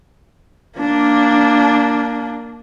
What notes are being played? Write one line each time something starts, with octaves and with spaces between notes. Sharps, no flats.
A#3 D4